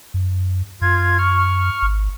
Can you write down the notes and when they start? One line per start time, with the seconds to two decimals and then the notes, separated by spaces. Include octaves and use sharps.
0.14 F#2
0.81 F#2 F4 G#6
1.18 C#6 F6
1.82 G#1